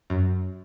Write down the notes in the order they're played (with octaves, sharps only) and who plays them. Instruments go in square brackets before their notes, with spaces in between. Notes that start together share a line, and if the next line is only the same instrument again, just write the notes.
[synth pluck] F#2